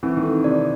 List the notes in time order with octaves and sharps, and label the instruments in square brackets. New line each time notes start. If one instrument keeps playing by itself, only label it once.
[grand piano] E3 [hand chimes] C4
[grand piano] D#3
[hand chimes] A4
[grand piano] C3 [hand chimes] D5